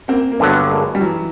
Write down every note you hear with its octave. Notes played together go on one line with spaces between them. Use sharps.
A#3 C4
A#3
G2 D3 F#3 A3 B3
G#3 A#3
G3
E3 F#3